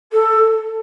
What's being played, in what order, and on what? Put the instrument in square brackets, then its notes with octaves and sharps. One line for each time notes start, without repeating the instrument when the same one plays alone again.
[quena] A4